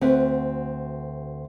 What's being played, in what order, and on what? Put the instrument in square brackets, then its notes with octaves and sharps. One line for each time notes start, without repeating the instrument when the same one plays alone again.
[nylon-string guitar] D2 C4 F#4 B4 E5